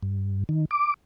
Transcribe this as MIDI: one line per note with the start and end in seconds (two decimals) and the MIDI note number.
0.03 0.44 43
0.49 0.65 51
0.71 0.94 86